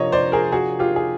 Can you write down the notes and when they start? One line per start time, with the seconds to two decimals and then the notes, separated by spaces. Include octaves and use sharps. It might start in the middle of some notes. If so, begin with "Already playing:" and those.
Already playing: C3 F3 A#3 D4 C#5 D#5
0.12 C5 D5
0.32 G#4 A#4
0.52 F#4 G#4
0.79 F4 G4
0.96 G#4